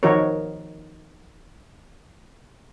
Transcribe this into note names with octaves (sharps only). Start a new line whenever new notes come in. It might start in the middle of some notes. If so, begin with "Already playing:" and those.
D#3 F3 D#4 F#4 A#4 C#5